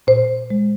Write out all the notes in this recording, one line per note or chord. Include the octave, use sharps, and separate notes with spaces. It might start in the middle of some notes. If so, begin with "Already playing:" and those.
A#2 C5
G#3